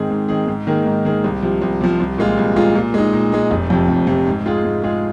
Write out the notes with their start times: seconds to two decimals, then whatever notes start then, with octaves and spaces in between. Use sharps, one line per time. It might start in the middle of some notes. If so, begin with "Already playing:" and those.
Already playing: G#2 D#3 C4 G#4
0.10 G#2
0.29 D#3 C4 G#4
0.47 G#2
0.67 D#3 A#3 G#4
0.86 G#2
1.05 D#3 A#3 G#4
1.24 C2
1.42 C3 F3
1.61 C2
1.81 C3 F3
2.00 C2
2.18 A#2 G#3 F4
2.37 C2
2.56 A#2 G#3 F4
2.75 A#2
2.94 G#3 D#4
3.13 A#2
3.32 G#3 D#4
3.51 F1
3.70 F2 C3
3.88 F1
4.07 F2 C3
4.27 G#2
4.46 G#3 F4 G#4
4.64 G#2
4.84 G#3 F4 G#4